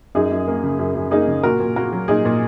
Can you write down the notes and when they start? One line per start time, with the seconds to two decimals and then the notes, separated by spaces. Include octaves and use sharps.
0.15 F#2 D#4 G#4
0.31 F#2
0.48 A#3
0.64 C#3
0.79 F#2
0.95 F#2
1.11 A#3 D#4 G#4
1.28 C#3
1.43 A#2 F#4 A#4
1.60 A#2
1.76 A#3 F#4 A#4
1.92 F#3
2.08 A#2 D#4 G#4
2.25 A#2